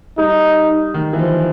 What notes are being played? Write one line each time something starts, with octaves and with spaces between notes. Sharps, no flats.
G3 D#4
D#3
E3
F3